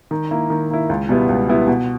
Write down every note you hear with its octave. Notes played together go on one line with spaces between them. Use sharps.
D#3
A#3 E4
D#3
A#3 E4
C#2
B2 G3 B3 E4
C#2
B2 G3 B3 E4
B2